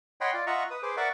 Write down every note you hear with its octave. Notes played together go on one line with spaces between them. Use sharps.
C#5 D#5 F#5 G5 B5 C6
F4 D5
F4 D#5 E5 F#5 A#5 C#6
B4 D#6
G#4 B4 C5 D6
A#4 D5 E5 F#5 C#6 D6